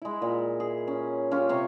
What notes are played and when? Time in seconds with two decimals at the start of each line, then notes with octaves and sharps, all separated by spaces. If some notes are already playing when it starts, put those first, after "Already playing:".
0.02 G#3 E4
0.22 A#2
0.60 G#4
0.88 C#4
1.31 C#4 F4 G4
1.49 C3 C5 C#5